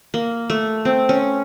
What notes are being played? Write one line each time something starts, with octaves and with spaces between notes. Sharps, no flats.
A#3
A3
C4
C#4